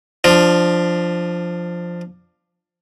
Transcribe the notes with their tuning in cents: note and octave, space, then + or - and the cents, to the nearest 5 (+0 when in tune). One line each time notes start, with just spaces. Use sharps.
F3 +0 D4 +15